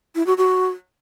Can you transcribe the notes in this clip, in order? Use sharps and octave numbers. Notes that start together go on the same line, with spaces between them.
E4
F#4
F#4